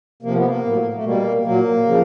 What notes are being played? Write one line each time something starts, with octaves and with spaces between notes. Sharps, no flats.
C3 F3 A#3
B3
A#3
A2 F#3
A3
B2 G3 A#3
A#2 F#3 A#3
C#3 F3